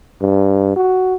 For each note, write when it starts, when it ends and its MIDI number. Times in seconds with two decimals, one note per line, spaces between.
0.21 0.75 43
0.76 1.15 66